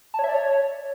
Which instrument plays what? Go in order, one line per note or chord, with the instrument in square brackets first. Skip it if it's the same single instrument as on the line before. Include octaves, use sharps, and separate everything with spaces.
[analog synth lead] A5
C#5
E5
D5
C#5